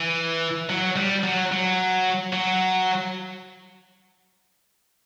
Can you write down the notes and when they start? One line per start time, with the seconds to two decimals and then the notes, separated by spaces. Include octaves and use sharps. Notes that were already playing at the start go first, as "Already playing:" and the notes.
Already playing: E3
0.70 F#3
0.97 G3
1.24 F#3
1.52 F#3
2.33 F#3